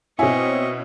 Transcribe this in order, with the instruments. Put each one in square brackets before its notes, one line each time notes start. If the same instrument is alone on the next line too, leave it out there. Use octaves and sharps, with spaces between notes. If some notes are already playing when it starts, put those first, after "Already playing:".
[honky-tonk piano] B2 C#4 E4 [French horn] C4 [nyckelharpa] D#5 C#6 [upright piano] G#5